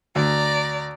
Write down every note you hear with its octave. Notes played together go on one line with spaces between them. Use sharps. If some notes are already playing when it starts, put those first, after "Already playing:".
D2 D5 A#5